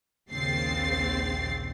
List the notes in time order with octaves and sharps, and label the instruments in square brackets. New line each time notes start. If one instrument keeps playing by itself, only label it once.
[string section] A#1 D#2 C#3 C4 A6 C7